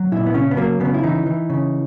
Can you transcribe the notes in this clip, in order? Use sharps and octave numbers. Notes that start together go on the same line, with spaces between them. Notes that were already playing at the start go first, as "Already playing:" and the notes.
Already playing: F#3
A#2 E4
B3
C#3 C#4
B3
F#3 A#3
C#3 B3
E4
E3 D#4
E3
C#3